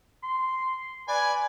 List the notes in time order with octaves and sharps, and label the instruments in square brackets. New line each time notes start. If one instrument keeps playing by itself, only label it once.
[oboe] C6
[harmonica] B4 G#5 [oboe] D5